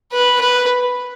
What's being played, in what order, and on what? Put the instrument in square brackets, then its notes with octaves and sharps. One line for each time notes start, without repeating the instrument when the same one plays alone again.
[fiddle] B4
B4